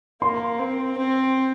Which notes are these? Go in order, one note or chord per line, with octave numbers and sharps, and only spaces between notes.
A#3 C6
C4
C4